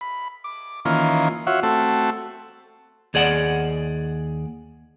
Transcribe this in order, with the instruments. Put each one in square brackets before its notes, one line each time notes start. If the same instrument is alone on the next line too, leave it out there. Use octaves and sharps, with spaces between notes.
[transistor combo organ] B5
D6
D#3 E3 A#3 C#4 F4
F4 F#4 C#5 E5 F#5
A3 C4 F#4 A4
[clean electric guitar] D#2 G#4 D5 F#5